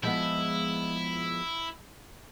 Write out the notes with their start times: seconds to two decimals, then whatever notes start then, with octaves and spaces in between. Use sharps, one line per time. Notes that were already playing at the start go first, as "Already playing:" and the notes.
0.03 F3 G#3 B3 E4